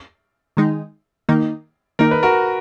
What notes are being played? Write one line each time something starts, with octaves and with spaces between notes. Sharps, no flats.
D#3 G#3 D#4
D#3 A#3 D#4
D#3 A#3 D#4 A#4
B4
F#4 A#4